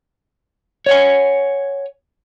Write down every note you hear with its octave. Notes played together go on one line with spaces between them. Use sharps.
C#5 F#5 G#5